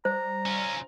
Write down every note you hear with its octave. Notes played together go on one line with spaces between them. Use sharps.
G3 C5 A#5
C#4 F4